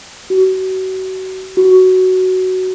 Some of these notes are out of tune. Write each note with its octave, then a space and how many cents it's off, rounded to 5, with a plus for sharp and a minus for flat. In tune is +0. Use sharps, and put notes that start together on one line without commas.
F#4 +30
F#4 +10